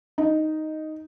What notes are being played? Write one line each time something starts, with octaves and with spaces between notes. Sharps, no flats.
D#4